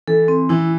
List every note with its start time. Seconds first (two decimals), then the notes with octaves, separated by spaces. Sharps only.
0.07 E3 A4
0.28 C4
0.49 E3 E4